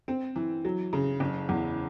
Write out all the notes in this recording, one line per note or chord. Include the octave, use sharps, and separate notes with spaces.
C4
E3
F#3
C#3
F#1
E2